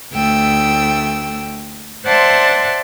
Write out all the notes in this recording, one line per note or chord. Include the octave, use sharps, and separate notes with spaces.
D2 A3 G5 E6
C5 D5 E5 F#5 A5 C6